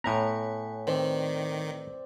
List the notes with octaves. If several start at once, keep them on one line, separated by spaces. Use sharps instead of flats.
A2 B3 C#5 G#5 A#5
D#3 C4 B4 C5 D5